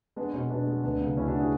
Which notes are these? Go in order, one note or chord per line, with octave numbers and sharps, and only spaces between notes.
G#3 B3 D4
B2 C#4
B2 B3 D4
G#3
D2 B3 D4
C#3
D2 C#4 E4
D4 F#4
E4 G#4